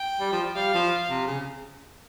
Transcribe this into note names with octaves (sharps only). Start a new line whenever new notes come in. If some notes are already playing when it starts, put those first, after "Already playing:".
Already playing: G5
G3
F3
G3 F5
F3
C3
C#3